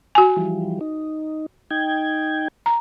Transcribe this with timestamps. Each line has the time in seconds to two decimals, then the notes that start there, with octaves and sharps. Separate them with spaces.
0.15 F#4 G#5
0.37 E3 F3 G3
0.81 D#4
1.71 D#4 G5 G#6
2.66 A#5